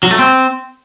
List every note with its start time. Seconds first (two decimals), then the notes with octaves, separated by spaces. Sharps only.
0.03 F#3
0.11 A3
0.19 C4